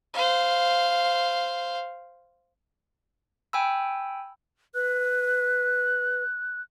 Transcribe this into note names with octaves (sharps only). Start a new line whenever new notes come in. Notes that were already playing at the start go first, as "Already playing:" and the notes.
C5 F5
G5 G#5 B5 E6
B4 F#6